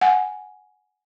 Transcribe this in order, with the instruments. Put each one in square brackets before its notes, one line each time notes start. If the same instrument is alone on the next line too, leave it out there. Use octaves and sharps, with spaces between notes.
[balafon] F#5 G#5